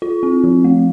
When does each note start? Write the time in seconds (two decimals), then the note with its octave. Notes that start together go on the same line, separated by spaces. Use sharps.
0.02 F4
0.23 C4
0.44 F3
0.64 A3